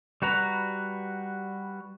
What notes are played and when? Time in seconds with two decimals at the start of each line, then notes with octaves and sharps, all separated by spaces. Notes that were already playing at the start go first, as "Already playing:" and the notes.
0.22 G3 F#4 B4 A#5